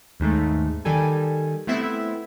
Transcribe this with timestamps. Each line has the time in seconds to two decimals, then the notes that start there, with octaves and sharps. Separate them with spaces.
0.20 D#2 G#2 A3
0.85 D#3 G3 A4 G#5
1.67 A3 B3 C4 E4 E5